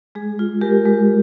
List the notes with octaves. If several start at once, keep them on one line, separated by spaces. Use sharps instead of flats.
G#3 G#4
F4
G#3 G4 A#4
G#3